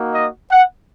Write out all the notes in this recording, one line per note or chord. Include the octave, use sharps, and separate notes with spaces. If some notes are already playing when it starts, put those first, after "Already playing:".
Already playing: A#3 D#4 F#4
D#5
F#5